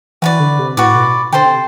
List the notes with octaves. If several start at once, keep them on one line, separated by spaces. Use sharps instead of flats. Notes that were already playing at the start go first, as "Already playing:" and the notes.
E3 F#4 B4 D5
D3
C3
A2 F#4 B4 D5
B2
D3 A4 C5 G5 C6
C3